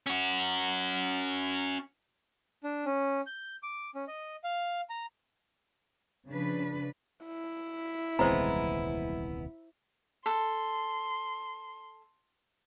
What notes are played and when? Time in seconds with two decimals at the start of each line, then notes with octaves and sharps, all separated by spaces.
0.06 C#4 F#4
2.64 D4
2.85 C#4
3.27 G6
3.63 D6
3.95 C#4
4.08 D#5
4.44 F5
4.90 A#5
6.28 C#3 F3 D4 B4
7.26 E4
8.19 D#1 C2 E3 G#3 B3 C4 C5 A#5
10.26 A4 C6